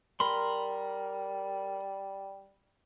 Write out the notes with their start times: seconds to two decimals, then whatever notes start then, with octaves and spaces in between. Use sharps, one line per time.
0.20 G3 A#4 B5 C6